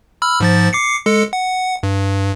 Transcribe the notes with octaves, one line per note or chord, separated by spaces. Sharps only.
B5 E6 F6
G#2 F3 A6
D6 C7 C#7
G#3 A4 C#7
F#5
G2